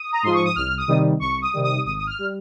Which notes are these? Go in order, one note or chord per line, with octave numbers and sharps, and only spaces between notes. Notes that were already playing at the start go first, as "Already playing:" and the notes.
Already playing: D#6
A#5
G#2 F3 C6
C#6
D#6
C2 F6
D#6
C3 D#3 G3
C2 C#6
D#6
C3 D#3 G3
D#6
G#1 D#6
D#6
F6
G3